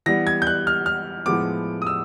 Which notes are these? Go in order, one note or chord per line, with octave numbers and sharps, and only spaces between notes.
E3 G3 B3 A#6
G#6
G6
F#6
F6
F6
A2 F3 G#3 B3 D6
D#6
E6